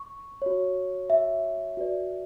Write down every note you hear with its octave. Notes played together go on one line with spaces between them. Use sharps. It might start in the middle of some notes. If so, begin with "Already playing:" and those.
Already playing: C#6
F#4 C#5
E5
F#4 B4 D5